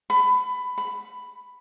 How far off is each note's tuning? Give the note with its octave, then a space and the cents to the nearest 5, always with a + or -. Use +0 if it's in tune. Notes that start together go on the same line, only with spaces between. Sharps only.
B5 +20
B5 +5